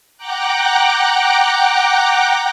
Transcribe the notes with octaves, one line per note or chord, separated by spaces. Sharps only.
F#5 G5 A#5 D6 F#6